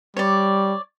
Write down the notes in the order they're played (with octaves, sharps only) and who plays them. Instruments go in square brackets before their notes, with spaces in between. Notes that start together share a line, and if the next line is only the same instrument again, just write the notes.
[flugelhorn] G3 [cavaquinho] C#5 D5